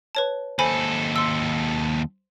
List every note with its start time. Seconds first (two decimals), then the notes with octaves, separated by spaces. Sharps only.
0.15 B4 C#5 A5
0.59 D#2 A4 C5 G#5 B5
1.16 C6 E6